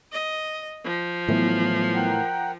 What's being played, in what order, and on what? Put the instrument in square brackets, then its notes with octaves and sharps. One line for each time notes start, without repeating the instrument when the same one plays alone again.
[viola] D#5
F3
[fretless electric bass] A2 E3 [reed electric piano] F#3 B3
[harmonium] A#4 F#5 G5